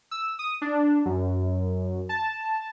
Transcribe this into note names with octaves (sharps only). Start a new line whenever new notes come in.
E6
D#6
D4
F#2
A5